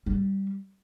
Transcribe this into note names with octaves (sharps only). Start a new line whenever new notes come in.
G3